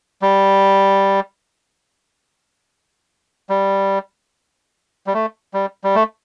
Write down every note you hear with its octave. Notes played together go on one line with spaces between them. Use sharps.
G3
G3
G3
A3
G3
G3
A3